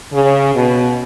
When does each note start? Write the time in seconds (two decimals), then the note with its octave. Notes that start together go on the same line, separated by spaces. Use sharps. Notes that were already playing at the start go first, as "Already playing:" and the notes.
0.13 C#3
0.55 B2